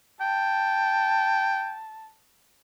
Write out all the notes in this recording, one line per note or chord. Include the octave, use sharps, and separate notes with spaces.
G5 A5